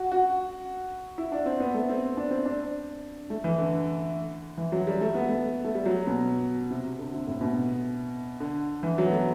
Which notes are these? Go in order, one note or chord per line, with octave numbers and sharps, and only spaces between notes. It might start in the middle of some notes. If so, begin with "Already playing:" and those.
Already playing: F#4
F#4
E4
D4
C4
B3
A3
C4
D4
C4
D4
A3
E3
D3
E3
F#3
G3
A3
B3
A3
A3
G3
F#3
B2
C3
D3
C3
A2
B2
D3
E3
F#3
B3
A3